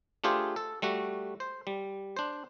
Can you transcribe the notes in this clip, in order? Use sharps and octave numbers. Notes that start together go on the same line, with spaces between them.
A3 D4 F4 G4 G#4 C5
A4
G3 A3 F#4
C5
G3
D4 C5